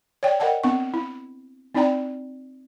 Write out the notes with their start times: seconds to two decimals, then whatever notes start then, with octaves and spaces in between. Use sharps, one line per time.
0.23 C#5 D5 G5
0.40 A#4 D#5 F#5 G5 A5
0.63 B3 C4 D4 C#6
0.94 E4
1.75 C4 D#4 E4 D5 G5 A#5